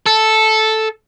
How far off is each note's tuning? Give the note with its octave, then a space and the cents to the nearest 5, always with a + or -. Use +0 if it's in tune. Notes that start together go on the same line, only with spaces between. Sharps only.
A4 -5